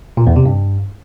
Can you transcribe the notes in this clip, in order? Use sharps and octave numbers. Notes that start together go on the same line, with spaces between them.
A#2
E2
C3
G2